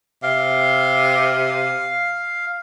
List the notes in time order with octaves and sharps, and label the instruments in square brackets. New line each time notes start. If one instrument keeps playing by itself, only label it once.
[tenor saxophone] C3 [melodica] F5